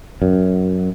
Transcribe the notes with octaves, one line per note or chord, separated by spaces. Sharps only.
F#2